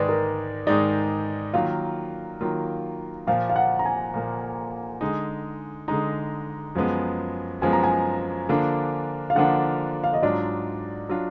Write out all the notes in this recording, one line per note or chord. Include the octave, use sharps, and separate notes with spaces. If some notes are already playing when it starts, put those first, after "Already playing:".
Already playing: G#2 D#3 G#3 D#4 B4 D5
A#4
G#2 D#3 G#3 D#4 D5
D#3 F#3 A#3 F4 F5
D#3 F#3 A#3 F4
A#2 F3 A#3 F5
F5
F#5
A#5
G#5
A#2 F3 A#3
D3 G#3 D#4
D3 G#3 D#4 A#5
F#2 F3 G#3 B3
F#2 F3 G#3 B3 G#5
A#5
G#5
D3 F3 A#3 D4 F4
F5
D3 F3 A#3 D4 F4 F#5
F5
D#5
G#2 F#3 D4 F4 D5
F#3 D4 F4